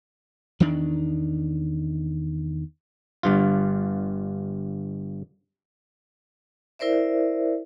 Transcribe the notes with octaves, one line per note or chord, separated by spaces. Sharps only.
E2 D#3 D4
G1 G2 F4
E4 A#4 C5 D5 E5